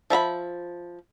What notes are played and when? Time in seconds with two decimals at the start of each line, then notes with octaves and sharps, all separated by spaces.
0.10 F3 E5 A#5 B5